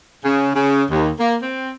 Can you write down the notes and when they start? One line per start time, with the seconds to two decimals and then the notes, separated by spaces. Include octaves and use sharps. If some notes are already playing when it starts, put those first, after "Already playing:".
0.25 C#3
0.55 C#3
0.90 D#2
1.19 A#3
1.42 C4